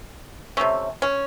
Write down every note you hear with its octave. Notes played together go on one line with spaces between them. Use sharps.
C3 D#3 A3 C#4
C#4